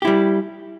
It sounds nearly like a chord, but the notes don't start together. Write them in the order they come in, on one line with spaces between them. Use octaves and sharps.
G4 E4 G3